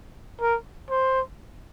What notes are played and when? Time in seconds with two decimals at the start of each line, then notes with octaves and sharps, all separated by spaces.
0.41 A#4
0.90 C5